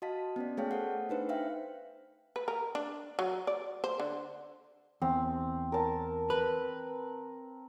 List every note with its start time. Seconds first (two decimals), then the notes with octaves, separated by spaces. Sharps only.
0.02 F#4 D#5 F5 A5 B6
0.36 B3 C#4 D5
0.57 A3 G#4 C#5 F5 G5 A5
0.71 A4 C5 F5 F#5
1.09 D4 D#4 B4 C5
1.29 E5 F5 G5
2.36 B4
2.48 A#4
2.75 D4
3.19 F#3
3.47 D5
3.84 C5
4.00 D3
5.02 E2 C4
5.72 A#4 A5
6.30 B4